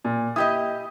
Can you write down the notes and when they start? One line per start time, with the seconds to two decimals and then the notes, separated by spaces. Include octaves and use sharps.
0.04 A#2
0.36 E4 G4 D#5 D#6